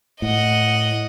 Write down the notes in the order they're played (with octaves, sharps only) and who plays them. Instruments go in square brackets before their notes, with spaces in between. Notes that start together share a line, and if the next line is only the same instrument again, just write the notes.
[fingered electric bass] A2 [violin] D#5 F#5